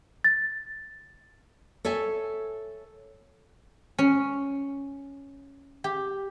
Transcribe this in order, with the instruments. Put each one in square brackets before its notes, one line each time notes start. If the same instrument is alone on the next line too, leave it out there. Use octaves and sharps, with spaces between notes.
[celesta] A6
[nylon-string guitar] A4 C#5 E5 G#5
[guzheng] C#4
G4